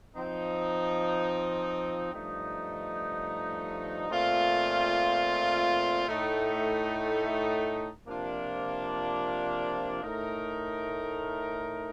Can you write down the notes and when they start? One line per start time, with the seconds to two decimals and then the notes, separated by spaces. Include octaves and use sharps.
0.16 F3 C4 D#4
2.13 G2 F3 A3 D#4
4.10 A#2 A3 C4 F4
6.08 A2 A3 D#4
8.05 C3 F3 A#3 D4 F4
10.03 A2 A3 D#4 A#4